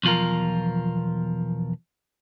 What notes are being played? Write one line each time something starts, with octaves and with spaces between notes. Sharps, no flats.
B1 E2 F3 F4 A#4